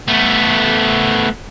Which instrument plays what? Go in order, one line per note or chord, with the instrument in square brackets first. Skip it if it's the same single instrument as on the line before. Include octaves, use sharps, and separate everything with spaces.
[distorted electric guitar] A3 B3